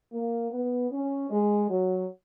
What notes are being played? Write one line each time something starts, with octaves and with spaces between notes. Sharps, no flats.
A#3
B3
C#4
G#3
F#3